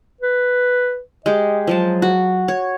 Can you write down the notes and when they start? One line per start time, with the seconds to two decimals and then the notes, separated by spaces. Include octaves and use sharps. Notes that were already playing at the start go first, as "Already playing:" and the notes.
0.21 B4
1.26 G#3 G4 D#5
1.67 F3 F#3 G#3 A5
2.02 F#4
2.48 C#5